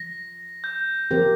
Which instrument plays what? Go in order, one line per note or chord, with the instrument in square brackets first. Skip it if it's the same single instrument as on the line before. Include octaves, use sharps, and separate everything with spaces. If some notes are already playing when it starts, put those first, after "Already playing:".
Already playing: [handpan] F3 [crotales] A#6
[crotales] G6
[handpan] F3 C4 G4 A#4